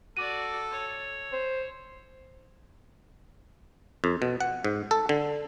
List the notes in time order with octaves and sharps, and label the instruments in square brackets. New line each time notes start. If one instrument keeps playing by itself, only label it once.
[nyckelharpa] F#4 D5 [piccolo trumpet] A4 [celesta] D6 D#7
[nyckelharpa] C#5
[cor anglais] C5
[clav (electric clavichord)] F2
B2
F#5
G#2
A4
D3